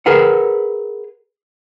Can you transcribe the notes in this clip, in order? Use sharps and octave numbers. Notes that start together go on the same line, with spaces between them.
G#4 A#4 B4 F#5